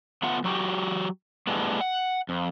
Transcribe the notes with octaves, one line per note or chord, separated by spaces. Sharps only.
A3 B3 F4 F#5
F#3 F#4 G4
A2 G3 G#3 B3
F#5
F2